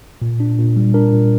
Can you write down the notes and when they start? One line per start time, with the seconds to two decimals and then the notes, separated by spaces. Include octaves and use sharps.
0.22 A#2
0.40 D4
0.59 A#2
0.77 G3
0.94 D4 A#4
1.12 A#2